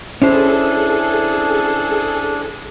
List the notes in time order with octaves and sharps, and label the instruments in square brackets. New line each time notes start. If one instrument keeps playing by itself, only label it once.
[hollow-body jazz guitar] C#4 E4 C5 [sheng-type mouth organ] D4 [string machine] G#4 A4